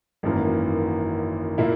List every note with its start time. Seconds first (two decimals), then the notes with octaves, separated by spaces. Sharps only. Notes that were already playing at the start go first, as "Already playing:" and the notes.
0.23 G#1 F#2 E3 A#3
1.58 A#2 A#3 E4